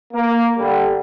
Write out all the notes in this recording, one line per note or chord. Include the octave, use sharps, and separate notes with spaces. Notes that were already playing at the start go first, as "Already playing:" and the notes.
A#3
D3 G3